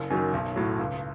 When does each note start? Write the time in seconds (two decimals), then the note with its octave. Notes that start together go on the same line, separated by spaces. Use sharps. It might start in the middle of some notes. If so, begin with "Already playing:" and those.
Already playing: F#1
0.10 F#2 D#3 F#3
0.33 B1
0.56 A2 F#3
0.79 C#2